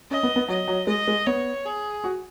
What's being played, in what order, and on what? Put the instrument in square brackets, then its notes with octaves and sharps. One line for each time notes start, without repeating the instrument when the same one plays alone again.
[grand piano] C#4 [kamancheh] D#5
[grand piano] B3
B3
[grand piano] F#3 [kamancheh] D#5
[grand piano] F#3
[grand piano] G#3 [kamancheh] D#5
[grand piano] G#3
[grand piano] B3 [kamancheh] C#5
[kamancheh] G#4
[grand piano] F#4